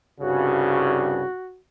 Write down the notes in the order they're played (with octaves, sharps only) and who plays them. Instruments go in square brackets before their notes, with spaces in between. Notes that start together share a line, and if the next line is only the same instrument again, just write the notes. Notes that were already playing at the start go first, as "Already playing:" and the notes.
[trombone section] C2 G2 C#3 [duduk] F#4